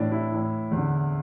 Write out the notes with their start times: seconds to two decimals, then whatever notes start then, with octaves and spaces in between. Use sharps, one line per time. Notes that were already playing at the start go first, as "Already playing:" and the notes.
Already playing: A2 E3 D4
0.11 E4
0.32 A2 E3
0.71 E2
0.77 D3